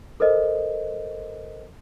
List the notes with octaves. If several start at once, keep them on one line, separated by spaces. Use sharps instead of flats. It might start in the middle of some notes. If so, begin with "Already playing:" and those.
A4 A#4 C5 D#5